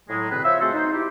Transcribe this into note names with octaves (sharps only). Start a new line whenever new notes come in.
A2 F#3 G#3
E2 B2 D3 C4 B4
F4 C5 C#5 E5
G#3 A3 C4 F#4 A4 C5
D#4 C5
E4 G4